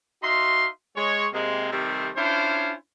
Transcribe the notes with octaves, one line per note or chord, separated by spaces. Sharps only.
D#4 F#4 E5 F5 C6
G#3 C#5
C3 G#3 A#3
C3 D#3 G3 A3 C4
C#4 D4 E4 F4 C5